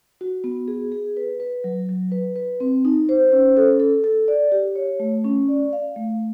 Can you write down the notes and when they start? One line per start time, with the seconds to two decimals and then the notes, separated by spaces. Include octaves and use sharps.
0.21 F#4
0.44 B3
0.68 G#4
0.92 G#4
1.17 B4
1.40 B4
1.64 F#3
1.89 F#3
2.12 B4
2.36 B4
2.60 C4
2.85 D#4
3.09 C5
3.32 C#4
3.57 A4
3.80 A4
4.04 A4
4.28 D5
4.52 G4
4.76 C#5
5.00 A3
5.24 C#4
5.49 D5
5.73 F5
5.96 A3